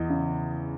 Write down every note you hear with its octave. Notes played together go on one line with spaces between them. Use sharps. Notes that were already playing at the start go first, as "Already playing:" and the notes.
Already playing: E2 D#5
C#3